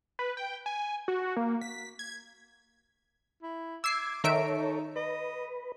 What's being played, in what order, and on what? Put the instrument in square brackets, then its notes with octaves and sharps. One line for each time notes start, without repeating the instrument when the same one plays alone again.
[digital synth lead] B4
G5
G#5
F#4
A#3
B6
G#6
[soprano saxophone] E4
[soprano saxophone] D6 [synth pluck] E6 C7 [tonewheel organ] G#6
[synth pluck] D#3 E5 D7 [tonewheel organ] A4 C#5 [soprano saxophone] A#5
[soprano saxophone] D#4
[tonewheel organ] B4 [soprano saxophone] D#5